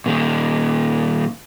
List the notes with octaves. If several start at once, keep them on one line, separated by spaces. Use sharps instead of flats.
A#2 D#3